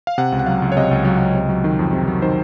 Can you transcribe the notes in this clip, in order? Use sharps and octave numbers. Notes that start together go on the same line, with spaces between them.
F5
C3 F#5
C#2
F#5
F#3 F5
C#2
C#5
C3 D#5
C#2
F#3
C#2
C3
F#3
D#3
F2
C3
F#3
D#3 C5